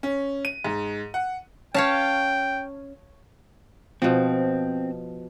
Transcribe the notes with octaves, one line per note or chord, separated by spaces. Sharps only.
C#4
D#7
G#2
F#5
C#4 C#5 F5 G5 A5
B2 F3 C4